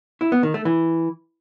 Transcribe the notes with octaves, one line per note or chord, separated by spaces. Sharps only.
E4
B3
D#3
A3
E3